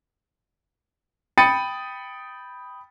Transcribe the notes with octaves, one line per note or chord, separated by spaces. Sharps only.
G5 B5 D#6 A6 C#7 D#7